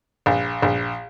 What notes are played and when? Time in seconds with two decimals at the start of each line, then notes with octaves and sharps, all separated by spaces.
0.26 A#1
0.62 A#1